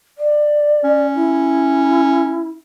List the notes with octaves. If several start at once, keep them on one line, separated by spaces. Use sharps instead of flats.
D5
C#4
E4